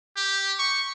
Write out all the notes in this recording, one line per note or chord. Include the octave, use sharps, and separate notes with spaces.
G4
C#6